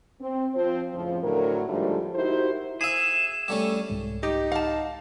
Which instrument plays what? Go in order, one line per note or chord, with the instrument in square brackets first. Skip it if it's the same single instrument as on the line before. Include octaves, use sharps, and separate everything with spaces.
[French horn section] C4
F3 C4 C5
F2 A2 C#3 F3
A2 D3 F#3 A#4
G#2 D3 F3 G3 A3
D#4 E4 F#4 G4 A#4 C5
[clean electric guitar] G#4 [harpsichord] E5 B5 [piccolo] E7
[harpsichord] G3 A3 C#4
[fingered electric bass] C2 G#2 G#3
[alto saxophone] D#4 [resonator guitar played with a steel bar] G4
[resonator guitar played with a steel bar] F5 A5